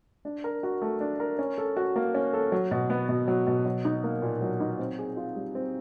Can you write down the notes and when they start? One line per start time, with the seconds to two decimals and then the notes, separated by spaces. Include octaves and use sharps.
0.25 D4
0.44 A#4
0.63 F#4
0.82 A3
1.01 D4
1.20 A#4
1.39 C#4
1.58 A4
1.77 F#4
1.96 A#3
2.14 C#4
2.33 A4
2.52 F#3
2.71 B2
2.90 B3
3.09 B2
3.28 F#3
3.47 B2
3.66 F#3
3.85 D#4
4.04 A#3
4.22 A#2
4.41 F#3
4.60 D#4
4.79 C4
4.98 G#4
5.17 F4
5.36 G3
5.55 C4